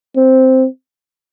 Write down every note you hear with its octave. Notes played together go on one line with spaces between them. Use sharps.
C4